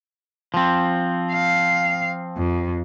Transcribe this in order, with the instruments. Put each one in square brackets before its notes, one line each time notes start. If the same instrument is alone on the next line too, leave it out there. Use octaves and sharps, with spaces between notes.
[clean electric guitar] F3 C4
[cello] F5
F2